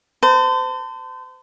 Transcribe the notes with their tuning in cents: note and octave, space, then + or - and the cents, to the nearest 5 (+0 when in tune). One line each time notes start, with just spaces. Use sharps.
C5 -35 A5 +40